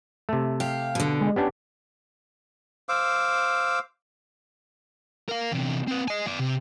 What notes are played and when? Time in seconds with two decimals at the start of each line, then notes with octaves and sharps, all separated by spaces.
0.29 C3 A3
0.60 G4 F5
0.95 B2 D3
1.21 G#3
1.36 B3 C#4 D4 G4
2.89 C5 F5 D6 E6
5.28 A#4 F5
5.52 E2 C3
5.87 C4 B4
6.08 D#5 G#5
6.27 B3 D5
6.39 C3